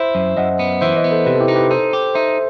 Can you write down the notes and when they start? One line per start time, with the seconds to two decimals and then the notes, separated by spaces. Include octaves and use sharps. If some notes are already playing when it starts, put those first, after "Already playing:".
Already playing: E4 C5 E5
0.15 F#2
0.37 F#2 D#5 F#5
0.59 B3
0.81 E3 C5 E5
0.96 B4 D#5
1.04 B3
1.12 A4 C5
1.26 C3 G4 B4
1.36 A4
1.41 E4 G4
1.48 D#4
1.56 G4 B4
1.70 D#4 A4 C5
1.93 G4
2.15 D#4 C5 E5